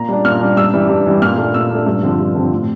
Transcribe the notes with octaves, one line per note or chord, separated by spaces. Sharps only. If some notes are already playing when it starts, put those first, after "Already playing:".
Already playing: A#2 A#5
G3 D4
A#2 F6
G3 D4
G2 E6
E3 G3
G2
E3 G3
A#2 F6
A3 D4
A#2 E6
A3 D4
G2
D3 F3 C4
G2
D3 F3 C4
A2